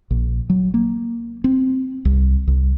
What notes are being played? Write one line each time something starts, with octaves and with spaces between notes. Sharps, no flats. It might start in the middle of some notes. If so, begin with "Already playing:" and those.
A#1
F#3
A#3
C4
C2
C2